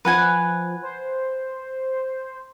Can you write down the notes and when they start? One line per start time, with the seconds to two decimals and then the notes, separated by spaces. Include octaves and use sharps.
0.05 F3 B4 F#5 G#5
0.82 C5